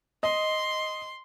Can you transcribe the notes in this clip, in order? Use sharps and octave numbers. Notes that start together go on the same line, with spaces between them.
D#5 C6